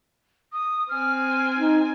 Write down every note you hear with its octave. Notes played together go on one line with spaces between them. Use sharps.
D#6
C4 G#5 F6
D#4